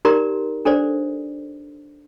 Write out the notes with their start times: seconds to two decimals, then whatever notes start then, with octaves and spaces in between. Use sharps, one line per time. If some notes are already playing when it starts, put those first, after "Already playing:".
0.05 D#4 G4 A#4 D5 A#5 C6
0.65 D4 A4 C5 D5